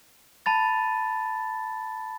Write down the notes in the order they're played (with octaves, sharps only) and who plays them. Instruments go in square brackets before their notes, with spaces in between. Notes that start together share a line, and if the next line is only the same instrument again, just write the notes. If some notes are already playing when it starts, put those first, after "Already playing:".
[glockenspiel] A5 B5 A6